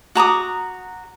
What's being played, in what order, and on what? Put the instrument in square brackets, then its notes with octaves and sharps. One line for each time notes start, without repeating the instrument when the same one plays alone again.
[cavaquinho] F#4 A#5 D6 D#6